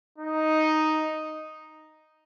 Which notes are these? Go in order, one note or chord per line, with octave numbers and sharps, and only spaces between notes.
D#4